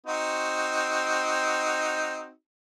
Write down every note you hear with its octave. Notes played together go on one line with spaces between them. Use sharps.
C4 D#4 F#4